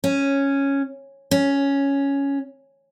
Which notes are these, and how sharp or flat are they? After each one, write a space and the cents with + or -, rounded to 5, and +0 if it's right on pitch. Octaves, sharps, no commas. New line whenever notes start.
C#4 -5
C#4 +5